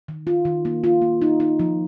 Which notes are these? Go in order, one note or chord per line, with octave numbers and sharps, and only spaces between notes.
D#3
F4
D#3
A#3
F4
A#3
D#4
D#4
F3